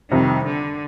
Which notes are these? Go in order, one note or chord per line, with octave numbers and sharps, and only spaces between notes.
F2 C3 D#3 G3
D3